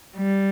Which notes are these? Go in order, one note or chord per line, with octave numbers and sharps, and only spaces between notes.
G3